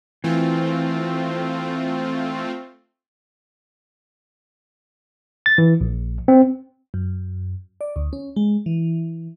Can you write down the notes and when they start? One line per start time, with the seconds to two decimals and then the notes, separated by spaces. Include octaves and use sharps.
0.24 E3 A3 C4 F4
5.46 A6
5.58 E3
5.81 A#1
6.28 C4
6.94 F#2
7.81 D5
7.96 D2
8.13 C#4
8.36 G#3
8.66 E3